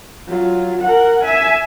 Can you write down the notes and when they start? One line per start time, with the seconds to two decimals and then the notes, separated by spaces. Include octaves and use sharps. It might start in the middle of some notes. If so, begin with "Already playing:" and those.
0.28 F#3 F4
0.82 A#4 F#5
1.24 E5 G#5